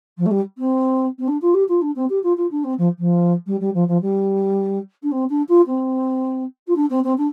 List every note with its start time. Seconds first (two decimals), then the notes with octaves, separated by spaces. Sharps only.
0.17 F3
0.25 A3
0.30 G3
0.58 C4
1.18 C4
1.27 D4
1.41 F4
1.54 G4
1.68 F4
1.81 D4
1.95 C4
2.09 G4
2.23 F4
2.37 F4
2.50 D4
2.63 C4
2.78 F3
2.98 F3
3.46 G3
3.60 G3
3.74 F3
3.87 F3
4.01 G3
5.02 D4
5.11 C4
5.29 D4
5.48 F4
5.66 C4
6.67 F4
6.75 D4
6.89 C4
7.03 C4
7.17 D4